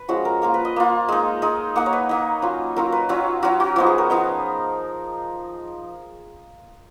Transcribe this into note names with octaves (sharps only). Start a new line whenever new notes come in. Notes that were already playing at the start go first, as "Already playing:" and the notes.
Already playing: B4
F3 G#3 C#4 F#4
A#4
A#3 F4 A#4
B4
D#5
A#3 F4
G#3 D#4
G#3 D#4
A#3 D#4 F#5
C#5
B4
A#3 D#4
F#3 C#4 F4
F#3 C#4 F4 A#4
B4
F#3 C#4 F4
F#3 C#4 F4 F#4
F#4
F3 B3 D#4 F#4
G#4
A#4
F3 B3 D#4